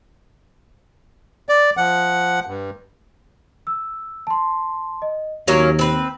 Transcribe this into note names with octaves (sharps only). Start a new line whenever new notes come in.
D5
F3 F#5
G2
E6
A5 C6
D#5
D#2 F#3 A#3 C#4 A#6
C4 B4